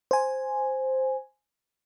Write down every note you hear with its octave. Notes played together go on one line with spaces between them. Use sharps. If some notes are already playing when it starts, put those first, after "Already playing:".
C5 G#5